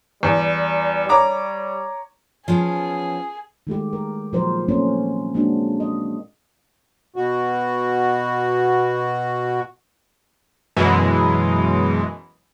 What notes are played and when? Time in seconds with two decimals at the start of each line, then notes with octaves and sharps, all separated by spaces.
0.23 E2 G3
1.09 G3 C#5 A#5 D6
2.48 F3 B3 C#4 G#4
3.67 D#3 G#3 A3 G4
3.93 A#4
4.33 A#2 F3 F#3 D#4 A#4 C5
4.68 A3 A#3 C4 C#4
5.34 G#3 A#3 C4 D4 F#4
5.80 D#5
7.16 B2 F#4
10.77 F#2 B2 E3 G#3